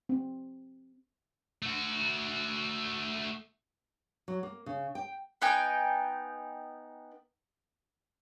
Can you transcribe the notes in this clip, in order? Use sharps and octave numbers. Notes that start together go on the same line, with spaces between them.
C4
A3 F#4
F#3
A#3
C#3
G5
B3 D#4 G5 G#5